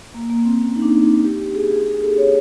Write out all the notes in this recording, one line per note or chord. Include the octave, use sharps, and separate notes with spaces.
A#3
A#3
C4
C#4
D#4
D4
D#4
G4
G#4
G4
G#4
G#4
A4
C#5